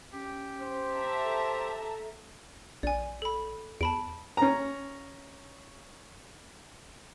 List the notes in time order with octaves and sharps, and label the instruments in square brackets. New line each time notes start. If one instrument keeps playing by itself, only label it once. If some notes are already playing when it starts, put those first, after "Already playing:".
[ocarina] C#4 [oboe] G4
[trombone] C5
[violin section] E5 A5 A#5
[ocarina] A4
[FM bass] A#1 [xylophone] D5 G#5
[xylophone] A4 B5
[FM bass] E2 [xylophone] A5 B5 D7
[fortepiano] C#4 A#5